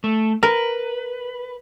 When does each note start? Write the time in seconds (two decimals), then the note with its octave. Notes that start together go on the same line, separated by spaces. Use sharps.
0.04 A3
0.43 A#4 B4